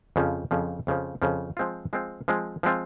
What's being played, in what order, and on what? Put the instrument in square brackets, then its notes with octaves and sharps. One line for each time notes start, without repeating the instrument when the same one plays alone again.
[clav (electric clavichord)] F2 C#3 F3
F2 C#3 F3
F2 C#3 F3
F2 C#3 F3
F3 G#3 C4 F4
F3 G#3 C4 F4
F3 G#3 C4 F4
F3 G#3 C4 F4